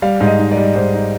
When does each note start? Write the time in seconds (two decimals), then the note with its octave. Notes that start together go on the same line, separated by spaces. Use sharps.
0.02 G3 F5
0.21 G#2
0.27 D#5
0.39 D#4
0.51 D5
0.57 G3
0.75 G#2 C5
0.94 D#4